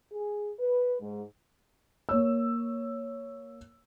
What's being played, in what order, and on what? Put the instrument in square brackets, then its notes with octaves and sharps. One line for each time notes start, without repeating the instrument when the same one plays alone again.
[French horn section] G#4
B4
G#2
[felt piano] A#3 C#5 E6